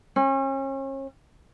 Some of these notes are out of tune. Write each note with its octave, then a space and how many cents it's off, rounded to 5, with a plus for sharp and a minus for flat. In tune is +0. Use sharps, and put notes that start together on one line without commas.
C#4 -40